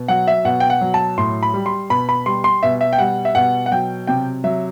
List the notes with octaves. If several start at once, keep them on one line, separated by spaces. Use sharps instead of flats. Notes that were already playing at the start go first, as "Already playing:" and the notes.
Already playing: B2
F#3 F#5
E5
B2 F#5
G5
F#5
F#3
A5
A2 C6
B5
G3
C6
B2 B5
B5
G3 C6
C6
B2 E5
E5
G5
G3 F#5
E5
B2 F#5
F#5
F#3 G5
C3 G5
F#3 E5